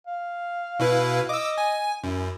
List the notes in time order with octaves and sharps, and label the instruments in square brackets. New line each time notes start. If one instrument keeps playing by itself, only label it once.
[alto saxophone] F5
[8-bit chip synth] B2 E4 B4
[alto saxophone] D#5 [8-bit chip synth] D6 E6
[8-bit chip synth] G#5
[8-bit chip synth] F#2 [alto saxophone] E4